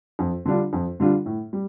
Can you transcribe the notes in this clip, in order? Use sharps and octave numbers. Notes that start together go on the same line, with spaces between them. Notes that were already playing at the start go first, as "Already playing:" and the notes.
F2
D3 G3 D4 F4
F2
D3 G3 D4 F4
A2
G3